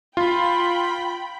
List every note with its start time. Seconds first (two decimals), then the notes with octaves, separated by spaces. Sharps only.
0.17 F4 G5 B5